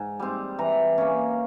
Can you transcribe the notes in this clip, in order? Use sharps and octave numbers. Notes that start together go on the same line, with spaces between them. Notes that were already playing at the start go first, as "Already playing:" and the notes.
Already playing: G#2
G3 C4
E3 A#5
A#3 C#4